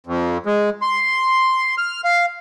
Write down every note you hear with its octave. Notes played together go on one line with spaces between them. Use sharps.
F2
G#3
C6
F6
F5